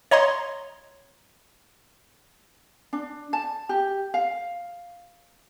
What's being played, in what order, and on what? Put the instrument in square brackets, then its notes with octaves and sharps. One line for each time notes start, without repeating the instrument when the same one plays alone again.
[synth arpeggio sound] C#5 D#5 A#5 C6
[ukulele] D4
A5
G4
F5